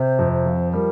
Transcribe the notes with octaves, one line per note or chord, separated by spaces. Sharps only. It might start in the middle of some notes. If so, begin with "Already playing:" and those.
Already playing: C3 C5
F2
C5
F3
G3 A#4